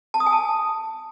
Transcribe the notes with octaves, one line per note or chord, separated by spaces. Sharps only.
A5
D#6
G#5
A5